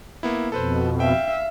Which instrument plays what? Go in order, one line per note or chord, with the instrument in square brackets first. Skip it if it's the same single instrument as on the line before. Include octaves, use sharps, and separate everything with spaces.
[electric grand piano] A#3 B3 E4
[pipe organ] F2 B2 [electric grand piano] A4 B4 C5
[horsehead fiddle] E5 F5 [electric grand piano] G5